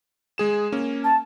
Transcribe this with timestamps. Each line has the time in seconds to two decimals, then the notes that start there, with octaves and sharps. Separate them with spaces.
0.38 G#3 G#4 E7
0.72 A#3 C#4
1.04 A5